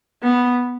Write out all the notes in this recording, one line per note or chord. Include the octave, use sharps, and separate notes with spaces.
B3